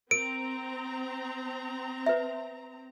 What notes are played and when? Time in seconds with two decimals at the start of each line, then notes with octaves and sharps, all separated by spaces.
0.11 C4 A#4 A#5 D7
2.06 B4 E5